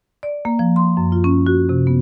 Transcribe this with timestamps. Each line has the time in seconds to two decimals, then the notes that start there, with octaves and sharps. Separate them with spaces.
0.23 D5
0.45 A#3
0.59 F3
0.76 C6
0.97 F#2
1.12 F4
1.24 C#4
1.47 F#4
1.69 C3
1.87 B3